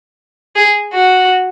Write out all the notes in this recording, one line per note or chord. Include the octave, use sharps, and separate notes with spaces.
G#4
F#4